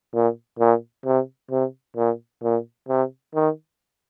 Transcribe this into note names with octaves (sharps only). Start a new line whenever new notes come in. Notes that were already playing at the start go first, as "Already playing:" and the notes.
A#2
A#2
C3
C3
A#2
A#2
C3
D#3